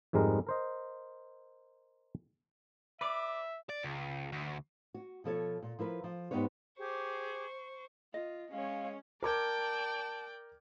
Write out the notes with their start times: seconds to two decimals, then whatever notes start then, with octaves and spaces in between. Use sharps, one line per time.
0.13 F2 G#2 G3 G#3 A#4
0.47 A#4 C5 D#5
3.01 B4 D5 E5 D6
3.69 D5
3.83 C#2
4.32 D2
4.94 F#4
5.24 B2 F3 A4 C#5
5.62 A#2
5.79 F3 E4 A#4 B4
6.04 F3
6.31 G#2 G3 B3 D#4 B4 C#5
6.79 G4 G#4 C5 C#6 D6
8.14 F4 D#5
8.52 G#3 C#4 C#5 F5
9.23 A#4 D5 G5 A5 D6 G#6